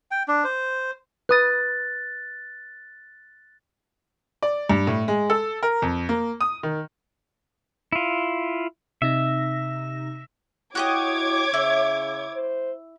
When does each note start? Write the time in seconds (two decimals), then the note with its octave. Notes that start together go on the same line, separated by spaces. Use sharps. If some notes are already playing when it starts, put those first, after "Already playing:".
0.11 G5
0.28 D4
0.44 C5
1.29 B4 D#6 F#6 A6
4.43 D5
4.70 G2
4.87 A2
5.08 G#3
5.30 A4
5.63 A#4
5.82 F2
6.09 A#3
6.41 D#6
6.63 D#3
7.93 E4 F4
9.02 C3 D#4 E5 A#6
10.75 E4 F#4 G4 C#5 D#5 D6 G#6
11.54 C#3 E4
12.34 C5